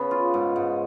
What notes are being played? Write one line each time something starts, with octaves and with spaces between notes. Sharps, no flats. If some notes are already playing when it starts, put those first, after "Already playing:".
Already playing: C#3 B3
F4
G#2
G#2